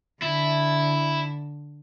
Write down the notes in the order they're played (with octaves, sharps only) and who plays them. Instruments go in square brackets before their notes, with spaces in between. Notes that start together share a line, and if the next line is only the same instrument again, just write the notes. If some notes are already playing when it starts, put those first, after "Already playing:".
[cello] D3 [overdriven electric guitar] E4